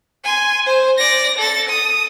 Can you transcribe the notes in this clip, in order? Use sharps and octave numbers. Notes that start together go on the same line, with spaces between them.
G#5 C6
C5
D5 A#6
A4 A6
D#6